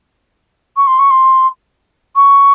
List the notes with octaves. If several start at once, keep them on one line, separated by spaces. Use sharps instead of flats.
C#6
C6
C#6
C6
C#6